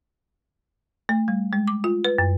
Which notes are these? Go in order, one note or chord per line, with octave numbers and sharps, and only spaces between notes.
A3
G3
G#3
D6
F4
B4
F#2